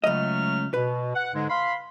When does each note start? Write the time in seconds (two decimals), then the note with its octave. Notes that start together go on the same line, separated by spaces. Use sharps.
0.04 C#2 F#3 A3 D#5 F6
0.74 B2 B4
1.15 F#5
1.34 G#2 D3 G#3
1.49 F5 B5 C6